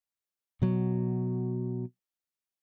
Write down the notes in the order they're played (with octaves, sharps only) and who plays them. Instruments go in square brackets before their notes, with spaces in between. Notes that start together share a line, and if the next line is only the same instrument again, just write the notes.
[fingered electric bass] B2 F#3